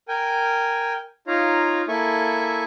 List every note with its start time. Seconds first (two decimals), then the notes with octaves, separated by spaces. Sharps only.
0.08 A#4 G5 G#5
1.27 D#4 F4 C#5 F5 A#5
1.88 A#3 E4 A4 E5 G#5 C#6